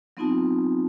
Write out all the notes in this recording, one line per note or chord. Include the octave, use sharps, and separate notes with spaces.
F#3 B3 C4 D#4 F4 A5